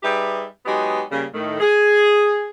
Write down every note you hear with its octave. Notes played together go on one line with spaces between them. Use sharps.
G3 D#4 G4 G#4 B4 E5
F#3 G#3 B3 D#4 G4
C#3 G3 A#3
A2 D#3 A3
G#4